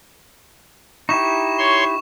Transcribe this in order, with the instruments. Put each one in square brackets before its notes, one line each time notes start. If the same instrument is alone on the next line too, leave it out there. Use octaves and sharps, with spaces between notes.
[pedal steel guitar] D#4 E4 G4 [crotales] C#6 E7
[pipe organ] C#5 C6